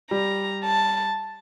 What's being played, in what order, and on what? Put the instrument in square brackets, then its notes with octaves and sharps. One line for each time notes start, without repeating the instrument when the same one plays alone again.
[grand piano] G3 [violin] A#5
[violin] A5